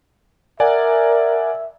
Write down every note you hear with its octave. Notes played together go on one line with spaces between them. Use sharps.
A#4 D5 E5 F#5 G#5